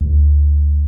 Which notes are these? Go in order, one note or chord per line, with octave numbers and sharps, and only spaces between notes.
D2